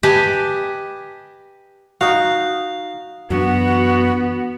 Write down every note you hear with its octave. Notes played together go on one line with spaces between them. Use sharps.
G4 B4 D#5 G#5 A5
D#4 F#4 F5
F#2 E3 B3 D4 F#4